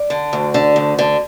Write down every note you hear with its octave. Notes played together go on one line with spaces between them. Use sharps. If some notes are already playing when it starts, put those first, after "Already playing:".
Already playing: D5
D3
D2
D3
D2
D3